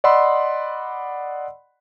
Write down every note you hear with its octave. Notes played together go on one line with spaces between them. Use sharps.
D5 D#5 F#5 B5 C6 E6